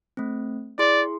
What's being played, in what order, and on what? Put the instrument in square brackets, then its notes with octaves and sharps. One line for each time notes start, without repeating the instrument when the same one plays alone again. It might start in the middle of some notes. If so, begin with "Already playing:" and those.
[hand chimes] A3 C4
[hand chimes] E4 G#4 C6 [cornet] D5